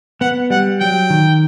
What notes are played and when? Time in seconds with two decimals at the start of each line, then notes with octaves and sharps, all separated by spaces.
0.21 B3 F#5
0.50 G3 F#5
0.80 F#3 G5
1.10 D#3